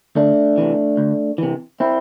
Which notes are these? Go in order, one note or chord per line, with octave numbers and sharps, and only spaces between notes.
D2 A3 D4
C3 E3
D2
C3 E3
C4 E4